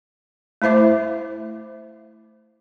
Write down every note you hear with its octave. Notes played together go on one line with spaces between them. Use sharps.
A3 E4 C5 E5 D6